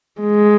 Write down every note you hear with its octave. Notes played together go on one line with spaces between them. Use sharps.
G#3